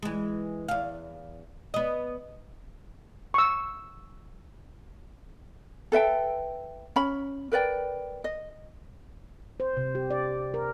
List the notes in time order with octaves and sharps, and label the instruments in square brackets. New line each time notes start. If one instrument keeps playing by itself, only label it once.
[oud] E3 G#3
E2 F5
B3 D#5
[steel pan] C#6 E6
[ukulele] A4 B4 E5 G5
C#4 B5
A#4 B4 D5 G5
D#5
[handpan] C5
C3
G4
D5
A#4